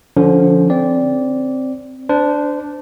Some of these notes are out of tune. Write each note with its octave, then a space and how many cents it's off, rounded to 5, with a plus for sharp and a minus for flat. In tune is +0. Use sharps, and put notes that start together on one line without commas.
D3 +0 F3 +0 C#4 +30
C4 +0 D5 -15
D4 +0 C5 -30